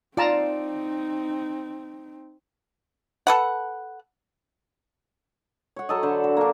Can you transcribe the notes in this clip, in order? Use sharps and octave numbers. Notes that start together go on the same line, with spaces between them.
C4 D#4 F4 D5 A5 A#5
A4 B4 F#5
C#5 F#5
F#3 A4 D#5
D3 C5 B5
F#4
A#3 D4